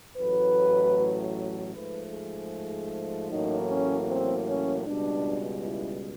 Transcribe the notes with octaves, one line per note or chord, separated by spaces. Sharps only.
A1 A2 F#3 B4
G#2 F3 A3 B4
G#4
A1 A2 F#3 A#3 D#4
C#4
C4
C#4
C#2 B2 G3 D4
E4